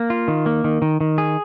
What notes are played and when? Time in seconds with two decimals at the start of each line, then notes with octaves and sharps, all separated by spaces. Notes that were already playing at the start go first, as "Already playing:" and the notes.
Already playing: A#3
0.10 F4
0.28 D#3
0.46 A#3
0.64 D#3
0.82 D#3
1.01 D#3
1.18 G#4